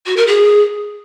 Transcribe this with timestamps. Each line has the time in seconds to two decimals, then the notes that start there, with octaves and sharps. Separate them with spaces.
0.06 F#4
0.16 A#4
0.27 G#4